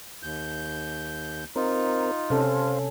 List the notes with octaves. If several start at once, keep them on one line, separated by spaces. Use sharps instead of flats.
D#2 G6
C4 D#4 F4 A#4
C3 C#4 A4 C5 F5